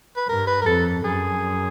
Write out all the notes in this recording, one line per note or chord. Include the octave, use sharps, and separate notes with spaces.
B4
G2 A#4
B4
A#4
F2 A4
F#2 G#4